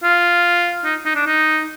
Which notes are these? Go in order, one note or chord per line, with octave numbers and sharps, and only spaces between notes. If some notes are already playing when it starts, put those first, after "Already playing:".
F4
D#4
D#4
D4
D#4